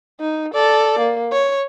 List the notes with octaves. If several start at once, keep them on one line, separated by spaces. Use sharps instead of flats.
D#4
A4 D5
A#3
C#5